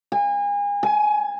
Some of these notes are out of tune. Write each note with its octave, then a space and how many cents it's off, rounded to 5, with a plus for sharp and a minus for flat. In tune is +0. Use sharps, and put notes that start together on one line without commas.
G#5 -35
G#5 +25